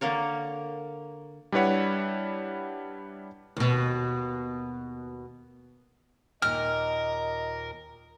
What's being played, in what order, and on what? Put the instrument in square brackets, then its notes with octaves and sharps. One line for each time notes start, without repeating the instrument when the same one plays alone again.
[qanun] D3 A#3 A#4 C#5
[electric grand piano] G3 D4 E4 B4 C#5 F#5
[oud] D#2 B2
[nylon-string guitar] D#2 A#2 [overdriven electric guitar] A#4 [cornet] D#5 [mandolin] F6